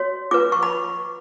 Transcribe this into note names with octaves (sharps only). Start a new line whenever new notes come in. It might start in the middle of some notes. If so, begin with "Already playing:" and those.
Already playing: F#4 C#5
F4 B4 D6
C#6
B5